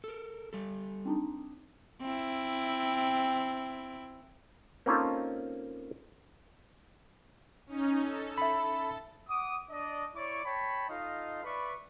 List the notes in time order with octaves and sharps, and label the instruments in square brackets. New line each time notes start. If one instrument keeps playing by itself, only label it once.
[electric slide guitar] A4 A#4
G3 A4
[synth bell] C4 D4 D#4
[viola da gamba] C4 E4
[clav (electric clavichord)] A#3 C4 C#4 D#4 F4 A4
[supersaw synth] C#4 D#4
A4
[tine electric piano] E5 B5
[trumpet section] F#5 D6 D#6
D4 D5 D#5
E4 C#5 D5 C#6 D6
C#5 G5 A5 B5
D#4 F4 A4 D#5 F5
B4 D5 E5 B5 C#6